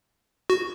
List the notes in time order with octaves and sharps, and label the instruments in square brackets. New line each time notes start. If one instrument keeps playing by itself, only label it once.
[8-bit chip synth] F#4